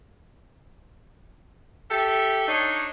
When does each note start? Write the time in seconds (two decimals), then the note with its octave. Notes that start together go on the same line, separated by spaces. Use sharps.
1.91 G4 A4 E5
2.48 D4 D#4 C#5